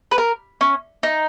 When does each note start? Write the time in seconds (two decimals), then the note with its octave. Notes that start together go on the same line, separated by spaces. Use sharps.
0.11 B4
0.18 A#4
0.61 C#4
1.03 D#4